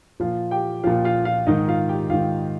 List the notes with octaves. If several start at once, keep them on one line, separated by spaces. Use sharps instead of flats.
A#2 F3 F4 F5
G4 G5
A#2 F3 F4 F5
F4 F5
F4 F5
G#2 D#3 D#4 D#5
F4 F5
G4 G5
G#2 D#3 F4 F5